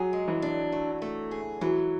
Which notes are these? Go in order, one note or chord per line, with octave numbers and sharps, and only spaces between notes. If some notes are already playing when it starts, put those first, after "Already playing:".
Already playing: F#3 G#4
G#3
E3
D4
A3
A3
G#4
E3 F#3